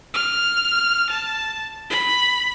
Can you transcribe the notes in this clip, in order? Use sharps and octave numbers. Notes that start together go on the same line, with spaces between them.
F6
A5
B5